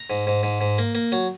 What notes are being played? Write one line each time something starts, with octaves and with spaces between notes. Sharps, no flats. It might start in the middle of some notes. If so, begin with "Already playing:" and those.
Already playing: A#5
G#2
G#2
G#2
G#2
A#3
A#3
F#3